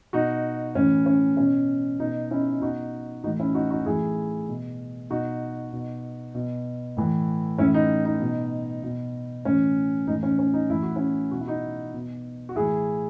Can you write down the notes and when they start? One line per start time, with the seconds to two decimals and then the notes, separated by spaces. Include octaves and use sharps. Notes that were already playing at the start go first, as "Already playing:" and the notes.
0.13 B2 D#4 F#4
0.75 A2 E3 C#4
1.06 C#4
1.37 B2 C#4
2.00 B2 D#4
2.31 C#4 E4
2.61 B2 D#4 F#4
3.24 A2 E3 D#4 F#4
3.39 C#4 E4
3.55 D#4 F#4
3.70 D#4 F#4
3.86 A2 E3 E4 G#4
4.48 B2
5.10 B2 D#4 F#4
5.73 B2
6.35 B2
6.97 A2 E3
7.58 A2 E3 C#4 E4
7.74 D#4
8.05 D#4
8.21 B2
8.83 B2
9.45 A2 E3 C#4
10.07 A2 E3 D#4
10.23 C#4
10.39 C#4
10.54 D#4
10.70 A2 E3 E4
10.83 F#4
10.96 C#4 E4
11.31 B2 F#4
11.40 E4
11.47 D#4 F#4
11.94 B2
12.49 F#4
12.56 A2 E3 E4 G#4